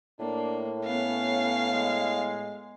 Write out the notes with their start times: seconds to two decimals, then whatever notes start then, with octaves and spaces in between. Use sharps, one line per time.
0.19 A2 A#3 D4
0.86 B3 C#4 F5
1.73 G#3